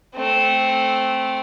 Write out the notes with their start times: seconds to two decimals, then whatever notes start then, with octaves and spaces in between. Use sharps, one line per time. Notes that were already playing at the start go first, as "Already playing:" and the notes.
0.15 A3 C4